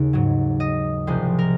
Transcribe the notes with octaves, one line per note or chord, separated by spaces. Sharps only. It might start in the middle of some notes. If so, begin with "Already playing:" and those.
Already playing: D#2 C#3 G#4
G#2 F#3
D#5
C2 C3 F3 G#3 C5
A#4